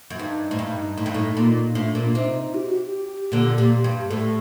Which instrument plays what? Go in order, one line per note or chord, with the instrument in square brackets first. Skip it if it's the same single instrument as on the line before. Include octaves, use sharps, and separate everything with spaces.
[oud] F#2
[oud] G2 [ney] D#4
[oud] A2
G2
A2
G2
A2
A#2
[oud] A2 [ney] D4
[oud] A#2
[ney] D4
[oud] C3 [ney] D#4
[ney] G4
F#4
G4
[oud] A#2 D3
A#2
G2
[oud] A2 [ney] A4